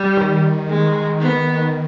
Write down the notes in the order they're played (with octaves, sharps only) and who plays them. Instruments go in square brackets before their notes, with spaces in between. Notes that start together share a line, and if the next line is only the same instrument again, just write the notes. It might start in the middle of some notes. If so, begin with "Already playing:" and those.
Already playing: [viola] G3
[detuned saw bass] D#3
[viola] G#3
B3